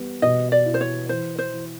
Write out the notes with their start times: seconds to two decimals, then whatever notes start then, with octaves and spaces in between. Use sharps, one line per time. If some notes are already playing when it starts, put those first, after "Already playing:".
Already playing: G3 B3
0.22 B2 D#5
0.52 D5
0.65 E4
0.74 C5
0.81 C#5
1.09 E3 C5
1.39 C5
1.53 E3